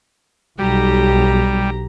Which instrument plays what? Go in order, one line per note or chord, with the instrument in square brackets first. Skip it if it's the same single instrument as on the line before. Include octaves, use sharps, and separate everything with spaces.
[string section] B1 [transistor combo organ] G3 [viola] G4 A#5